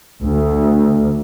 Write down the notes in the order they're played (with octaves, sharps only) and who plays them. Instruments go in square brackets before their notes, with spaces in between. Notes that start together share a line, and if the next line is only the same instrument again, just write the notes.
[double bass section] D2